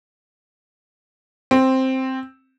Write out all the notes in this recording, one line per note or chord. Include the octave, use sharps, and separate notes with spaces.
C4